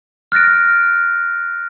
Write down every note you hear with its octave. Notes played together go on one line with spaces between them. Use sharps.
F6 F#6 A6 A#6 D7